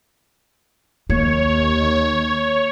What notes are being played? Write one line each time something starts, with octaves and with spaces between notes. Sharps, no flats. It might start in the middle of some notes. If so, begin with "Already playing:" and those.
D#2 A#3 C#5